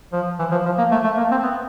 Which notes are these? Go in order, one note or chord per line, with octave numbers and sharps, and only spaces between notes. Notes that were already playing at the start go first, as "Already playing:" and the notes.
F3
E3
F3
F3
A#3
A3
A3
A#3
C4
B3